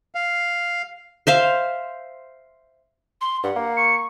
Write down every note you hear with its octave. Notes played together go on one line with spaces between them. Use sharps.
F5
C5 E5 F5
C6
G2 F#5
A#3
C#6 C#7